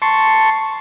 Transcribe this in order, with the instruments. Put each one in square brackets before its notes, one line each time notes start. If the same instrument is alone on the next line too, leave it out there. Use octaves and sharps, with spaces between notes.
[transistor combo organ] A5 C6 C#6